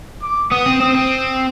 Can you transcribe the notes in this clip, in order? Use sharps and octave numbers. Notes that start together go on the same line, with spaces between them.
D6
B3 D#6
C4
C4 D#6
C4